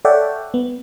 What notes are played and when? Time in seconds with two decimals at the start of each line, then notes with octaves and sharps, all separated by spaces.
0.05 A4 C#5 D5 E5 F#5 G5
0.54 B3